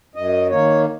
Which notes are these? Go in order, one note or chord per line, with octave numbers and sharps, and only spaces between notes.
F#2 D#5
D#3 A#3 C#5